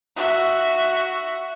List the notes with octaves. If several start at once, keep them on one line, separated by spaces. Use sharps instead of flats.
F#4 E5